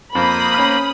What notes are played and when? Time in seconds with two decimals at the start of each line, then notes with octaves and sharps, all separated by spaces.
0.15 F2 A#3 C5 B5 D#6
0.54 C#4 F6